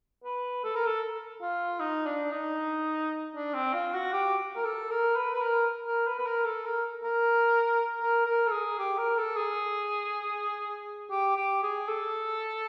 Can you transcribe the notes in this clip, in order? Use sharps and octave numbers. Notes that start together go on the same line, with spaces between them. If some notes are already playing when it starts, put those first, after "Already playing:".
B4
A4
A#4
A4
F4
D#4
D4
D#4
D4
C4
F4
F#4
G4
A#4
A4
A#4
B4
B4
A#4
A#4
B4
B4
A#4
A4
A#4
A#4
A#4
A#4
A4
G#4
G4
A#4
A4
G#4
G4
G4
G#4
A4